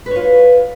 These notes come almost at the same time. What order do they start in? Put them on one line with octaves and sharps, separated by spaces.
B4 C#5 F4